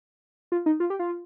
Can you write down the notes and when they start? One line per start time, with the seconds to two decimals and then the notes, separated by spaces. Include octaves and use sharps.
0.52 F4
0.66 D#4
0.80 F4
0.90 G4
0.99 F4